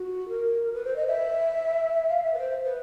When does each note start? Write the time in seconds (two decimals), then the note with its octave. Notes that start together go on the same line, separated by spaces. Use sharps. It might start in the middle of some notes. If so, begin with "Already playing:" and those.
Already playing: F#4
0.29 A#4
0.74 B4
0.85 C5
0.96 D#5
1.07 E5
2.09 F5
2.23 E5
2.34 B4
2.39 C5
2.65 B4